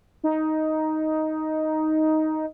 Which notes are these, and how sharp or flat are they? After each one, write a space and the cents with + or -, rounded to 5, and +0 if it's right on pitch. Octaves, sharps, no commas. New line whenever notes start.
D#4 +5